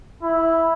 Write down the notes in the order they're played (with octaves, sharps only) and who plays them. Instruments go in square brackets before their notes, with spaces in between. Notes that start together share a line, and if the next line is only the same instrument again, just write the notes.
[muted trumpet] E4